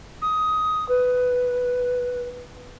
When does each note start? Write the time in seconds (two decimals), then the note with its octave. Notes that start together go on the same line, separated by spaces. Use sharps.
0.22 D#6
0.89 B4